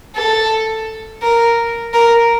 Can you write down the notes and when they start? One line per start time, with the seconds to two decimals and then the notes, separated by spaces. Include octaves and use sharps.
0.15 A4
1.22 A#4
1.94 A#4